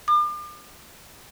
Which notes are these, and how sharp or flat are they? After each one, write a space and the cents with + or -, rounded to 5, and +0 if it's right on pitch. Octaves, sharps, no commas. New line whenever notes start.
D6 +40